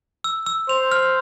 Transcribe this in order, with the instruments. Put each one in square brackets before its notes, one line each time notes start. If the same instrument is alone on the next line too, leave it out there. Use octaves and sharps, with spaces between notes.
[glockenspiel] E6
E6
[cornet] C5 [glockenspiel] F7
[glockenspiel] F6